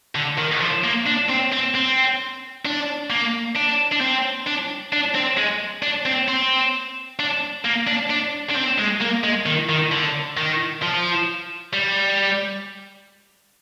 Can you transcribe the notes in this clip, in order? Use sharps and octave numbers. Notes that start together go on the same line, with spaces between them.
D3
D#3
F3
A#3
D4
C4
C4
C4
D4
A#3
D4
D4
C4
D4
D4
C4
G#3
D4
C4
C4
D4
A#3
D4
D4
D4
C4
G#3
A#3
G#3
D#3
D#3
D3
D#3
F3
G3